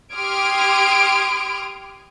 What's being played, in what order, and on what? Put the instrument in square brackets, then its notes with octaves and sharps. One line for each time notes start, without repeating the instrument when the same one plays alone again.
[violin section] G4 C6 D#6 F6 G#6 D7